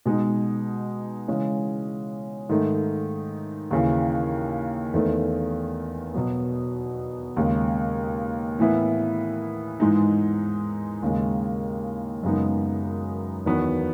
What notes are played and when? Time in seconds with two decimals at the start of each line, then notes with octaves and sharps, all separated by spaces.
0.06 B2 G#3 D#4
1.28 C#3 E3 G#3 C#4
2.49 G#2 D#3 A3 D#4
3.71 D#2 C#3 E3
4.94 E2 D#3 A3
6.14 B2 F#3 B3
7.36 D#2 C#3 G#3
8.59 A2 E3 B3 E4
9.80 G#2 E3 G#3 D#4
11.02 D#2 C#3 G#3
12.23 F#2 C#3 G#3 B3 D#4
13.46 E2 D#3 F#3 B3